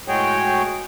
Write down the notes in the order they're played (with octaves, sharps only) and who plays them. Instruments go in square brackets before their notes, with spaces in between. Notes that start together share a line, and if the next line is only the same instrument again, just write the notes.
[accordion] A2 G#3 F#4 G#4 C#5 G5